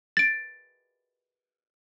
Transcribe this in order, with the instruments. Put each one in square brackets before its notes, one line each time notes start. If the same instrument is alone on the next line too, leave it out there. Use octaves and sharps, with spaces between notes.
[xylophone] A6 D7